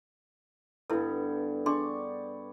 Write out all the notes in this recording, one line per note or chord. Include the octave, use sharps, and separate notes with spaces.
G2 D3 B3 E4 A4
D4 G#4 D5 C6 C#6